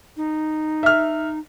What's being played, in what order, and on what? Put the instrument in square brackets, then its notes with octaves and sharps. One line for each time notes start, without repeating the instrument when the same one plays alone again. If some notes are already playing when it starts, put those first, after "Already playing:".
[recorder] D#4
[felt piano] E5 F6